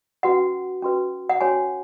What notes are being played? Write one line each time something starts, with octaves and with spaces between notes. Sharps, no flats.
C#4 F#4 B4 F#5
C#4 F#4 B4
F#5
C#4 F#4 C#5 G#5